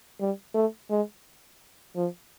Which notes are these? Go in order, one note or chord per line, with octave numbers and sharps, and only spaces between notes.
G3
A3
G#3
F3